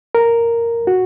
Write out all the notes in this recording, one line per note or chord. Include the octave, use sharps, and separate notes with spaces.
A#4
F#4